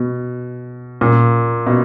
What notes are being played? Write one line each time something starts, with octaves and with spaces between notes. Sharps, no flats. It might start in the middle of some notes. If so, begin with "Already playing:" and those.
Already playing: B2
A#2
B2